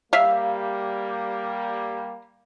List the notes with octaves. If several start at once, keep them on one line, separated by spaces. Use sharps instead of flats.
G3 A#3 E5 F5